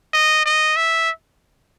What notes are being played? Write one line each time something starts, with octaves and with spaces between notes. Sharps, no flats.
D#5
D#5
E5